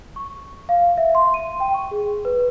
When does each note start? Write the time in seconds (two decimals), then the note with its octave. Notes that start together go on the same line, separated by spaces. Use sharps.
0.16 C#6
0.69 F5
0.97 E5
1.15 C6
1.34 D#7
1.60 G5
1.74 C#6
1.91 G#4
2.25 B4